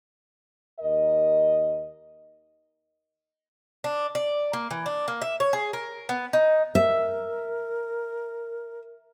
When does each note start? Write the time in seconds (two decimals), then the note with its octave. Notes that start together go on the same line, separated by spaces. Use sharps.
0.80 D#2 A#4 D#5
3.84 D4
4.15 D5
4.53 A#3
4.71 E3
4.86 D4
5.08 A#3
5.22 E5
5.40 C#5
5.53 G#4
5.73 A#4
6.09 B3
6.33 D#4
6.75 A#4 E5